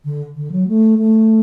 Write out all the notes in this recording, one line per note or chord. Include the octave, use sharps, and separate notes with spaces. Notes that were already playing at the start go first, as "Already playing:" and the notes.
D3
D3
F#3
A3
A3